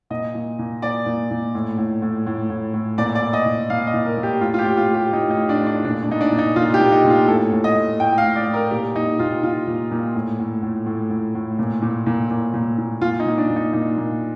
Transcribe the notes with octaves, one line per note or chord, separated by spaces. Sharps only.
A#2 D#5
A#2
A#2
A#2 D5
A#2
A#2
A2
A2
A2
A2
A2
A2
A#2 D5
D5
A#2
D#5
A#2
A#2 F5
D#5
A#2
A#4
A#2
G4
A2 F4
F4
G4
A2
F4
A2
G4
A2 D#4
D#4
A2
D4
A2
D4
A#2 D4
D4
A#2 D#4
D4
A#2
D#4
A#2 F4
G4
A#2
D#4
A#2
F4
A2 A4
A2
D#5
A2
A2 G5
F5
A2
D5
A2
A#4
A#2 G4
A#2 D#4
A#2 F4
A#2 F4
A#2
A#2
A2
A2
A2
A2
A2
A2
A#2
A#2
A#2
A#2
A#2
A#2
A#2 F4
D#4
A#2
D4
A#2
D#4
A#2 D#4
A#2